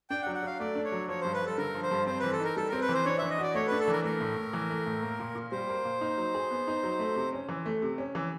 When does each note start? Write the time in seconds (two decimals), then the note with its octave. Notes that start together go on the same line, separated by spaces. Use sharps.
0.10 D4 G5
0.22 F#5
0.27 F#3
0.34 F#5
0.43 F#3 F5
0.59 A3 D5
0.76 D4
0.84 C#5
0.92 F#3
1.08 F3 C#5
1.21 G2 C5
1.33 B4
1.42 G2 A4
1.58 D3 A#4
1.74 F3
1.83 C5
1.91 G2
2.07 C4 C5
2.20 E3 B4
2.32 A4
2.40 D#4 A#4
2.56 G3 A4
2.69 C4 A#4
2.81 B4
2.89 E3
2.94 C5
3.05 D4 C#5
3.18 E3 E5
3.30 D#5
3.38 F#4 D5
3.55 A3 C#5
3.67 D4 B4
3.79 A4
3.88 E3 A#4
4.04 A3 A#4
4.21 A2
4.36 A2
4.53 E3
4.70 A3
4.86 A2
5.02 A#3
5.19 A#2
5.35 A#2
5.52 G3 C5
5.69 A#3
5.85 A#2
6.01 D#4
6.18 F#3
6.35 G#4
6.51 B3
6.68 D#4
6.83 F#3
6.99 A3
7.16 C3
7.33 C#4
7.49 E3
7.66 A3
7.82 C3
7.98 C#4
8.15 E3